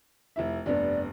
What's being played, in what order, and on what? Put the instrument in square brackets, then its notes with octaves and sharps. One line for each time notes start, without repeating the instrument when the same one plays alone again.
[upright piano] F1 E4 E5
[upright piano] F1 G2 B3 [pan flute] D5